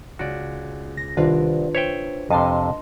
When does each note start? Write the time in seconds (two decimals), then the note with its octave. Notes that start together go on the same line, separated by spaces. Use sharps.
0.19 C#2 F#4 D5
0.97 A#6
1.17 C2 D#3 D4 F4 B4
1.75 C5 C#5 E5 G5
2.30 F2 C3 D#5 A5 C6